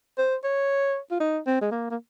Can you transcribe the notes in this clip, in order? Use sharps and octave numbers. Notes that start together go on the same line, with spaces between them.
C5
C#5
F4
D#4
C4
G#3
A#3
A#3